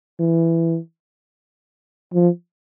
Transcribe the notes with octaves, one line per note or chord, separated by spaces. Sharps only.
E3
F3